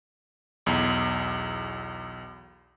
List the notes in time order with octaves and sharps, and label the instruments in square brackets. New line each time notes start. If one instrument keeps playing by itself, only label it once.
[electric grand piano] B1 E2